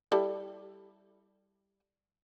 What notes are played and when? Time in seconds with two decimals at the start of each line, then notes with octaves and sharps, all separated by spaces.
0.12 G3 E4 A4